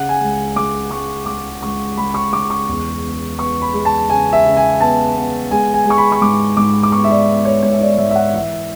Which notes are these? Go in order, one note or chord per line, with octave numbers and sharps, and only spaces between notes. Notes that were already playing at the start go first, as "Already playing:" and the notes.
Already playing: C#3 F#5
G#5
C#2
C#2 D6
G#3 C#6
C#2 D6
C#2 C#6
C#2 B5
C#6
C#2 D6
C#6
E2
B3
B3 C#6
B5
G#3
A5
C#3 G#5
E5
C#3
G#5
B3 A5
B3
G#3 G#5
G#5
G#3 C#6
B5
C#6
G#2 D6
G#2 D6
D6
B3 C#6
E5
D5
B3
C#5
G#2 C#5
E5
D5
G#2 E5
E5
F#5
E3 E5